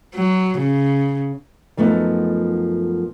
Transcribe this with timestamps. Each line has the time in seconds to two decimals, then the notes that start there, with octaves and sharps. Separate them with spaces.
0.15 F#3
0.58 C#3
1.77 F#2 F3 A3 B3 D#4